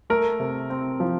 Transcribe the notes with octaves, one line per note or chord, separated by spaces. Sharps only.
A3 A#4
C3
C4
F3